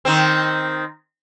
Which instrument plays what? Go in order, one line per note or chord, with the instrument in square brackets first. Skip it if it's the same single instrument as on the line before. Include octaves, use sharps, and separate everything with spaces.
[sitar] D#3 C4